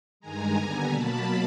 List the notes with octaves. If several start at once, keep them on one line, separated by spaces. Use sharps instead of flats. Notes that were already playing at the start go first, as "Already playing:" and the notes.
G2 D#3 G#3 G#5 A#5
D#2 D3 G3 B3
B2 F#3 A#3 A5 B5